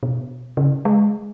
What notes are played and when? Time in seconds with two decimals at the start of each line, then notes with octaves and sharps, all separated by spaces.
0.03 B2
0.57 C#3
0.85 G#3